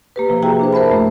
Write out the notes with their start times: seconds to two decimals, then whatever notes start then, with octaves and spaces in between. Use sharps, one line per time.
0.16 A#3 G4 B4
0.29 C3 F3 A#3
0.43 E4 F#4 G#4 E5 G5 A#5
0.59 D4 G#4 C5
0.73 A#4 C5 E5 A5 B5
0.90 F#2 A3